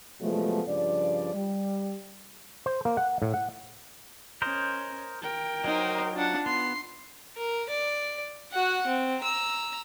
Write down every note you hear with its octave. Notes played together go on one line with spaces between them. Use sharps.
C3 F3 F#3 G#3 A3 B3
G2 C#3 F3 D5
G3
C5
A#3
F#5
A2
F#5
C#4 A#4 C5 D#5
A#4 G5
F#3 D#4 C5
D4 F4 F#5
B3 C6
A#4
D5
F#4 F#5
C4
A#5 E6